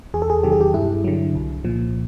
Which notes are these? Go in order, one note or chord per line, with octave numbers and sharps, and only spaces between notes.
E2 G#4
A4
G#4
C3 D#3 F#3 G4
G#4
G4
G2 E4
D3 F#3
C2
A#2 F3